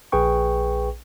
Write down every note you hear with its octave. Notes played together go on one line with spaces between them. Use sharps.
A#1 G#4 B4 G5 C#6